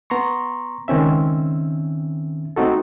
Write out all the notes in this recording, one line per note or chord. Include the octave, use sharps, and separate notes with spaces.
B3 A#5 C6 C#6
C#2 D#3 C4 C#4 E5
A3 C4 D#4 F#4 A4